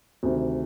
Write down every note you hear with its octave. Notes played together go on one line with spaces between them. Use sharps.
D2 C3 D#3